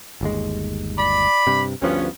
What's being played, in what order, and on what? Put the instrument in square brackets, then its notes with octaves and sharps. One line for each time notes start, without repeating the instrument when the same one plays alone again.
[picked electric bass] G1 D#2 G#3
[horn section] D5 B5
[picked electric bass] G2 C3
[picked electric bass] D2 F3 [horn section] G2 B3 C#4